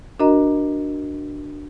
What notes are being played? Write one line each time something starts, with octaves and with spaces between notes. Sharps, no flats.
D4 F#4 A#4 D#5 A#5